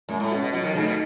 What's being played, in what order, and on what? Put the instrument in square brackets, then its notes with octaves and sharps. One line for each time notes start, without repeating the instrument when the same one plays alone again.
[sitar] F#2 [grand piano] G#3
[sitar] A2
[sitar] B2 [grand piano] C#4 F#4
[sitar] B2
[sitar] B2 [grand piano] F#3
[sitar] D#3
[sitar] C#3 [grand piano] A3 D#4
[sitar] B2